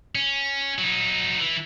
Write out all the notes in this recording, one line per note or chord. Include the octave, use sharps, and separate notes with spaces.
C#4
F#3 D#4
E3